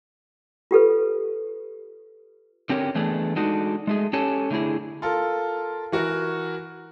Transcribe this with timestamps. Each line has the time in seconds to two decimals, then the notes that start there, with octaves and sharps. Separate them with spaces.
0.71 F4 G4 A4 B4
2.69 D3 C4 C#4 G4 A#4 C#5
2.95 E3 A3 B3 D4 G#4 A4
3.36 G#3 D4 D#4 F#4 A4
3.87 G#3 A3 G#4
4.13 C#4 G4 A4 C#5 G#5 A5
4.51 D3 A3 E4 G#4
5.02 F4 A4 A#4
5.92 E3 F#4 A#4 F#5